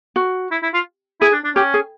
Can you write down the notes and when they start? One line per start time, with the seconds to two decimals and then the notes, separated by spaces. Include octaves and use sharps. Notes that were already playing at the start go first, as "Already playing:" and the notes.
0.16 F#4
0.51 E4
0.63 E4
0.74 F4
1.21 E4 G#4
1.33 D4
1.45 D4
1.56 C#4 G4
1.74 G#4